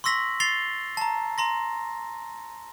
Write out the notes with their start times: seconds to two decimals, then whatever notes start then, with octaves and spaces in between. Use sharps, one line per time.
0.04 C6 C#6 E6 A#6 B6 F#7
0.40 A6 C7 F7 G7
0.97 A5 A#5
1.38 A#5 C6 A#6